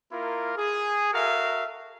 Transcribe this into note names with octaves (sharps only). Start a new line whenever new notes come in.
A#3 E4 F4 A#4
G#4
F#4 A4 A#4 E5 F5